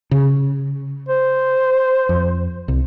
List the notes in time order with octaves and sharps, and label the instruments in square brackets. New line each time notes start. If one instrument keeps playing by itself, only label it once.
[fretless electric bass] C#3
[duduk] C5
[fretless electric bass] F2
C2